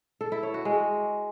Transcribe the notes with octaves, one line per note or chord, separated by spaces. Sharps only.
A4
E4
C#5
F#4
G#3